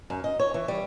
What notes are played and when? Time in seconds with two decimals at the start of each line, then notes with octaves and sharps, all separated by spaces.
0.10 F#2
0.24 D#5
0.39 C#5
0.54 E3
0.68 G3